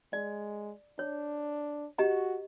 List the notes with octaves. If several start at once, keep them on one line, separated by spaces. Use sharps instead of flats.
G#3 D5
D4 C#5
F#4 G4 D#5 A#5